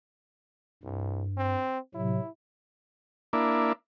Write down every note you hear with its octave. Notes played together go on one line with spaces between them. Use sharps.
C2 G2
C4
A2 C3 F#3 E4
A#3 D4 E4